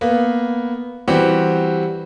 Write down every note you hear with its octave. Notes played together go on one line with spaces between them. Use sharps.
A#3 B3
E3 G3 C4 F#4 G4